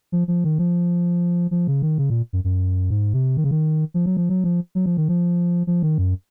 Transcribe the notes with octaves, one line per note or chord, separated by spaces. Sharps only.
F3
F3
D#3
F3
F3
C#3
D#3
C#3
A#2
F#2
F#2
G#2
C3
D#3
C#3
D#3
F3
F#3
F3
F#3
F3
F#3
F3
D#3
F3
F3
D#3
F#2